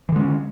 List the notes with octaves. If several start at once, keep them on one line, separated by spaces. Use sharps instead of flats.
D3 E3 G#3 C#4